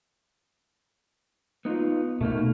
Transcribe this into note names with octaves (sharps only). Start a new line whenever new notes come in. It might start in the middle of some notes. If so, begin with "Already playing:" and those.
B3 D#4 F4
B2 A3 A#3 D#4